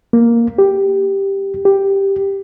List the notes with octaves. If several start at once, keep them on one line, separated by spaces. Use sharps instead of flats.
A#3
G4
G4